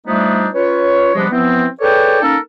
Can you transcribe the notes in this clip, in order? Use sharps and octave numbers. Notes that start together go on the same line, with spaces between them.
F3 G3 A3 B3 D4 D#4
C#4 F4 B4 C#5
C3 F3 G3 G#3 B3 D4
E3 F3 B3 C4
G#4 A4 B4 C#5 D5 G5
A#3 C#4 D#4 A4 A#4 E6